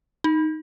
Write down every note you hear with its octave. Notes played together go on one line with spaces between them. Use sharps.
D#4